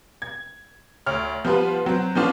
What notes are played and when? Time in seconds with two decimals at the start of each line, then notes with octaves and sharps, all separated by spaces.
0.22 G#6
1.06 D2 C#5 F6
1.45 F3 G3 B3 F4 B4
1.86 F#3 C4
2.15 F3 B3 C#4 D4 F4